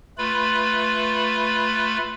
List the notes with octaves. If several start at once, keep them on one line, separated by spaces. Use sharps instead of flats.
A3 F4 B4 B5